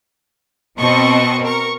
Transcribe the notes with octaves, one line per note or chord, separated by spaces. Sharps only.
B2 C4 D#5 A5 C#6
A#4 C#6